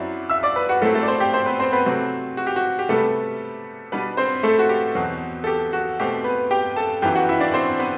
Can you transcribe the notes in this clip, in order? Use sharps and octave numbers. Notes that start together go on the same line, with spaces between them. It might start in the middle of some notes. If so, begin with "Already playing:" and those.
Already playing: F#2 F#3 C4 E4 D5
E5 E6
D5 D6
B4 B5
F#4 F#5
A2 F#3 A3 C4 E4 A4
A3 A4
D5
C4 C5
G4 G5
C4 C5
B3 B4
C4 C5
B3 B4
C3 F#3 A3 C4
F#4
G4
F#4
G4
C3 G3 A3 B3 A4
B2 G3 B3 D4 B4
C4 C5
A3 A4
F#4
G4
E2 B2 F#3 C4
A4
G4
F#4
B2 A3 C4 G4
B3 B4
G4 G5
A4 A5
F#2 E3 B3 E4 G4 G5
F#4 F#5
E4 E5
D4 D5
C4 C5
B3 B4